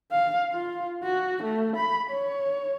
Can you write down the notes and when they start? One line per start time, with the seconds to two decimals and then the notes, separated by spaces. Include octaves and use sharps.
0.12 F5
0.52 F4
1.04 F#4
1.43 A3
1.76 B5
2.11 C#5